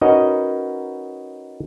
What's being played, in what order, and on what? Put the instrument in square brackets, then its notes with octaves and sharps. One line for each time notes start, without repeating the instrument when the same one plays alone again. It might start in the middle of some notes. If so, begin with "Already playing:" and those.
[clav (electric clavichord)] C#4 D#4 F#4 A#4 B4 D#5